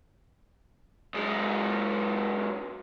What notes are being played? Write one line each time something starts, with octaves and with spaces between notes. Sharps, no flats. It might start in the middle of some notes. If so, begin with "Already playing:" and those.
F#2 G#3